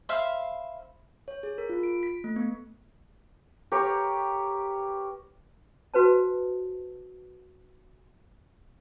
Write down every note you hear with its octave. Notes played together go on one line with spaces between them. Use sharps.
C5 E5 F5 B5
C#5
G#4
A#4
F4
D7
B6
A3
B3
G4 A#4 B4 C#5
F#4 B4 C5 A5